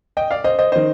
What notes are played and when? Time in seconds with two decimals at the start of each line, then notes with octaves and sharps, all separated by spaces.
0.17 D#5 G5
0.31 D5 F5
0.44 C5 D#5
0.59 C5 D#5
0.72 D#3 C5 D#5